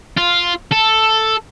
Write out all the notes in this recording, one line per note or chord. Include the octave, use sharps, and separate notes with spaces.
F4
A4